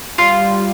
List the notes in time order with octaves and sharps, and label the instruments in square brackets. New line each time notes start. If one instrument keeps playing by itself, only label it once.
[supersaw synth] G3 [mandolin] F4